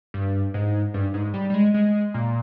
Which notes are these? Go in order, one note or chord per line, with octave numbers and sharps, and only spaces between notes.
G2
G#2
G2
G#2
G3
G3
G#3
G#3
A#2